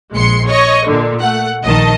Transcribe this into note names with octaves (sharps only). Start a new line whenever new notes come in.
A#1 G#3 C6 C#7
C#5 D#5 C#6
A#2 D3
A3 F#5
A#1 D#3 D#5 A5